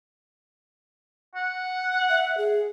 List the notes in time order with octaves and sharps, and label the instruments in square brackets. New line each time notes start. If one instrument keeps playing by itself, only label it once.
[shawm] F#5
[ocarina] E5
G#4